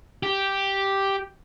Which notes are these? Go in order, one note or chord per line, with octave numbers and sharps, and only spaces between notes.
G4